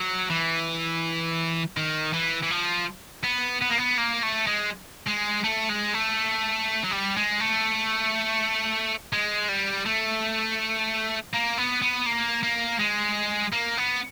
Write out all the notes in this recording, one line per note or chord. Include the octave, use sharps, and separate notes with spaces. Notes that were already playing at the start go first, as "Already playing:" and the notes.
Already playing: F#3
E3
D#3
E3
E3
F3
B3
B3
A#3
B3
A#3
A3
G#3
G#3
A3
G#3
A3
F#3
G3
G#3
A3
G#3
G3
A3
A#3
B3
B3
A#3
A#3
G#3
A#3
B3